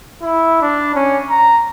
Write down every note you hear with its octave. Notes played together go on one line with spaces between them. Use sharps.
E4
D4
C#4
A#5